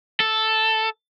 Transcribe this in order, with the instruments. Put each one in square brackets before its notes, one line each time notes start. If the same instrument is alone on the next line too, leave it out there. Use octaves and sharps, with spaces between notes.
[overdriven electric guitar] A4